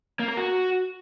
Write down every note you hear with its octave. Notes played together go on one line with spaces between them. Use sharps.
A#3
A#4
F#4